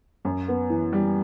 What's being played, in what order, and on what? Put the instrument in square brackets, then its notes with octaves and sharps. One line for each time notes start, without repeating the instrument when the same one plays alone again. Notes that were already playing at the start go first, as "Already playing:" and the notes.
[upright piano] F#2
B3
E3
G3